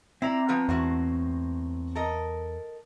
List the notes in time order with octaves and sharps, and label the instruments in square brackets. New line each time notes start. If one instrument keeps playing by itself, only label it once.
[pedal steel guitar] C4 A#5 [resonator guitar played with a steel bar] E4 D5
[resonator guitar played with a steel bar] F3 B3 B4
[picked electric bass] E2 [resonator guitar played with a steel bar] A2 F#4 C5
[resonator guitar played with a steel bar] A4 A#4 D#5